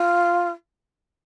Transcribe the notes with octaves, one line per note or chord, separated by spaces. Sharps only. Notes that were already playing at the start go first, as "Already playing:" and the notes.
Already playing: F4